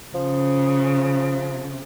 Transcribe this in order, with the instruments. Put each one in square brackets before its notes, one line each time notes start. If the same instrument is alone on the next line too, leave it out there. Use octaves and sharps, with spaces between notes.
[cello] C#3 [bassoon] F3